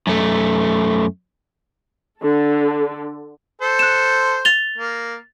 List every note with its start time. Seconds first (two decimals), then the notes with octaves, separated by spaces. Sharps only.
0.07 F#2 A3
2.21 D3 A4
3.62 A4 C5
3.79 F#6 E7
4.45 A6 F7 G7
4.78 A#3